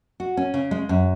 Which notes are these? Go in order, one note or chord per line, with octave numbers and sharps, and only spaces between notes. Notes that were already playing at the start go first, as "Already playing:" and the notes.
F#4
C#4
C#3
G#3
F#2